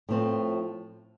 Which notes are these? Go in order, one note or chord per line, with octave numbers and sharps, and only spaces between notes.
A2 F3 C4